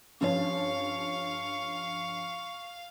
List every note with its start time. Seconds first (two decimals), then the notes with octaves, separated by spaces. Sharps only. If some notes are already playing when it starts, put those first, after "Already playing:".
0.21 G2 F3 C#4 F5 C#6